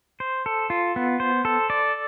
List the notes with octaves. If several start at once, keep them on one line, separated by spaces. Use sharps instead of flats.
C5
A4
F4
B3
C5
A4
D5